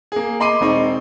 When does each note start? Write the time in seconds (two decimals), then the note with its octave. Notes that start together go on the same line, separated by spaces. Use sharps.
0.12 A#3 G#4
0.40 D#5 B5 C6 D6 C7 D#7
0.61 E1 C4 D#4 C#6